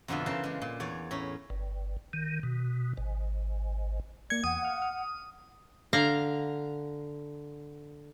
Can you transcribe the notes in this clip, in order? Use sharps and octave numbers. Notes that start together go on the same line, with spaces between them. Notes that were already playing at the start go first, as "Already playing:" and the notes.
F2 B2 D3 D4 F4 E5
C#3 E3 A#4 C5 F5 A5
G#3 D4
A#2
E2 C#5 D5 G#5
A2 C#4 A#5 B5
G1
D#3
B2
G#1
A#3 D5 G#6 C#7
E2 F#5 G5 D#6
F5 F6
F6
D3 F5 A#5